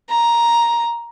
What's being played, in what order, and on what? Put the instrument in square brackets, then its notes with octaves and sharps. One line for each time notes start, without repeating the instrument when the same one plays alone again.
[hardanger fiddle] A#5